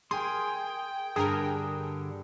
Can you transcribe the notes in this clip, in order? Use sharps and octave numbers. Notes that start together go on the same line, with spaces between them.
G#4 A#4 G5 G#5 C6
G2 D3 G#4 A#4 A5 D#6